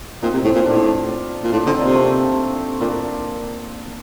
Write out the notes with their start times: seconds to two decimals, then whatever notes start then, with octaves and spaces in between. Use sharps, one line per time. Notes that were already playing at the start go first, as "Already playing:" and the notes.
0.22 A#2 C4 D#4
0.34 C3
0.44 A2
0.55 A#2
0.66 A2 D4 F4
1.44 A#2
1.52 A2 D4 F4
1.66 D3 C4 D#4
1.81 C3 A#3 D4
1.94 A3 C4
2.81 A#2 A#3 D4